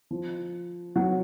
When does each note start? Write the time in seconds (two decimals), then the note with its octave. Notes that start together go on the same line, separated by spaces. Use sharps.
0.11 F3
0.96 F#3